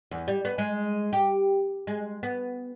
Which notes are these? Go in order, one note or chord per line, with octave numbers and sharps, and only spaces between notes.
E2
G3
B3
G#3
G4
G#3
B3